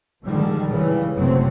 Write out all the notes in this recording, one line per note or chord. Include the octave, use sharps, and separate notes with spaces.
D3 D#3 F3 G3 G#3
C#3 E3 G3
F#1 F2 C3 F#3 A3 C4